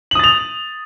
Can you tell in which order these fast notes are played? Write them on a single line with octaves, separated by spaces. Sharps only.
F#7 D#6 A6 F7